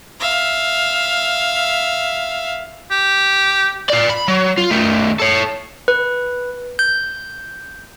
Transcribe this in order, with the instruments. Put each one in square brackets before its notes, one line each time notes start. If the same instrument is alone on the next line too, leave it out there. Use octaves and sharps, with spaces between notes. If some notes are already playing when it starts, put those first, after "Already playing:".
[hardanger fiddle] E5 F5
[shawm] G4
[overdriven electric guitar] F4 D5
B5
F#3
F4
D#3 A3
A4 C#5
[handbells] B4
G6